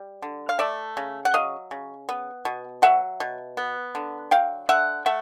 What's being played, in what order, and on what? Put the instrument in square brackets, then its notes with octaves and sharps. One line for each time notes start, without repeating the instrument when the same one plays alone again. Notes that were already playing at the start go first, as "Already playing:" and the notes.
Already playing: [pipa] G3
D3
F5
A3 D5 E5
C#3
F#5
F#3 D#5 F5
C#3
B3
B2
F#3 E5 F#5
B2
B3
D3
F#3 F5 G5
D3 E5 F#5
A3 E5 F#5